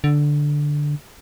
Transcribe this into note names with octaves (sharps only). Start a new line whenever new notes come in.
D3